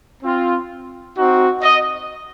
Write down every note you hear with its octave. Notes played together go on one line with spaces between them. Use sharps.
C4 F4
C4 D#4 F#4
D#5